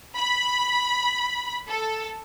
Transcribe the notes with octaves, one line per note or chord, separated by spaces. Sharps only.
B5
A4